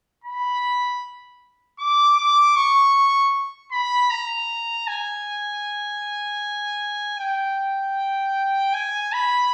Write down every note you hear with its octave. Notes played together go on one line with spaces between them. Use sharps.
B5
D6
D6
C#6
B5
A#5
G#5
G5
G#5
B5